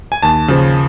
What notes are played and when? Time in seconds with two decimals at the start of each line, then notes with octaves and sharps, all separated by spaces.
0.12 G#5
0.23 D#2 A5
0.48 C#3 F3